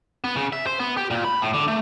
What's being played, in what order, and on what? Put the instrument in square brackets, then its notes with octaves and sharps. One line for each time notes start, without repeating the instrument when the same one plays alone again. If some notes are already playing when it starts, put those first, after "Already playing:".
[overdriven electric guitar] B3
C#3
E5
C5
B3
G4
A#2
B5
A2
D3
A3